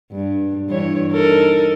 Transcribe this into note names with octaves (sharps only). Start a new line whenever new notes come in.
G2
G2 E3 C#5
D#4 A4 A#4